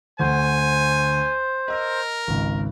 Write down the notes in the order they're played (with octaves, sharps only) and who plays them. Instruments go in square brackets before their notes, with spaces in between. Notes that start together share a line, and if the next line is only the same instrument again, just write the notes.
[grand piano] D2 F#5 [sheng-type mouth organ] C5 [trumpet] G#5
[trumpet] A#4 [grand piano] D#5 E6
[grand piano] G#1 C#2